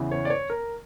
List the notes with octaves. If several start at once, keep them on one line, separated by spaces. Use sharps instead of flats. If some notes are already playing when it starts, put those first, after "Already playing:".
Already playing: E2 C#3 E3
C#5
D5
C#5
A#4